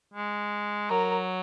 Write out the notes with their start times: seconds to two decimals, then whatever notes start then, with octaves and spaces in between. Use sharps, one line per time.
0.13 G#3
0.90 F#3 A#4